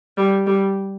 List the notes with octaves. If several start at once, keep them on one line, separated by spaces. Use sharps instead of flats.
G3
G3